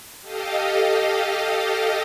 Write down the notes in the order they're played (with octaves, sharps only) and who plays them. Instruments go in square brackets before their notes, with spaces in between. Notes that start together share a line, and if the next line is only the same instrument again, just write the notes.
[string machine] G4 A4 D#5 F5